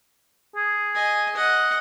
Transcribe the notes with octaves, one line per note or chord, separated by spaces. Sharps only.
G#4
D#5 G#5
D#5 F#5